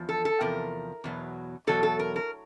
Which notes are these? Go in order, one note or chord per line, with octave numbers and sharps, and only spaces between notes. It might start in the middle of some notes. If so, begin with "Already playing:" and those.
Already playing: E2 F3
A4
A4
E2 C3 F3 A#4
E2 B2 F#3
E2 B2 F#3 A4
A4
A#4
A#4